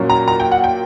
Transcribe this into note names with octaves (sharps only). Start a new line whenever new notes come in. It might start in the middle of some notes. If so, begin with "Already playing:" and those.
Already playing: A#2 F#3 A#3 C#4
A#5
A#5
G5
F#5
G5